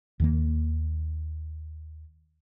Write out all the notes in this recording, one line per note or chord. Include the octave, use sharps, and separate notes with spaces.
D#2 D#3 A#3